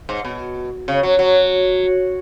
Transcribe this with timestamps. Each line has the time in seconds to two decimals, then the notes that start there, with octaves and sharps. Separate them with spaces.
0.09 G#2
0.25 B2
0.88 C#3
1.03 F#3
1.19 F#3